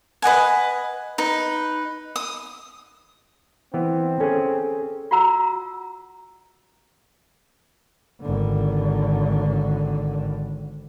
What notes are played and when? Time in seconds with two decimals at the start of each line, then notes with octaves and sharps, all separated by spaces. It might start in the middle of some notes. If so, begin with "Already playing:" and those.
0.22 B4 D#5 F#5 G#5
1.18 D#4 B4
2.16 D#6
3.74 E3 B3 C4
4.20 C#4 G#4 A4
5.11 F4 F#4 F#5 A#5 E6
8.21 G#1 D3